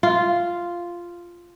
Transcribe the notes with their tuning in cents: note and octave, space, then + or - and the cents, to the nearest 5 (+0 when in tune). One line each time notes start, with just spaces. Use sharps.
F4 -5